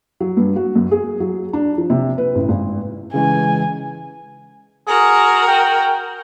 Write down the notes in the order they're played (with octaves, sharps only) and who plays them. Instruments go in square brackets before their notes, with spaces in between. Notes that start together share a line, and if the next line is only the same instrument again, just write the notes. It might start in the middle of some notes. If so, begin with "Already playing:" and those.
[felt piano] F#3
G2
F#4
F#2
G#4
F#3
D4
F3
C3
B4
A1
G#1
[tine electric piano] C#3 E3 G#3 [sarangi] G#5
[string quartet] F#4 A#4 [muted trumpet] G#4
[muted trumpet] G5